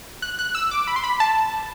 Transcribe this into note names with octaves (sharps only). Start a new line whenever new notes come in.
F#6
F#6
E6
D6
B5
C6
B5
A5